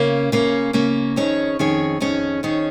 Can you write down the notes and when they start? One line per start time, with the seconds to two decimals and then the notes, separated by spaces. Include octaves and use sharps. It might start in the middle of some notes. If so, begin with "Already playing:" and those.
Already playing: C#3 A#3 C#4
0.32 C#3 A#3 C#4
0.73 C#3 A#3 C#4
1.16 F2 D#3 C#4 G#4 C#5
1.59 F2 D#3 C#4 G#4 C#5
2.00 F2 D#3 C#4 G#4 C#5
2.43 F2 D#3 C#4 G#4 C#5